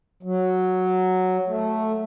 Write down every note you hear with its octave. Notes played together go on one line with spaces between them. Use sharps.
F#3
A3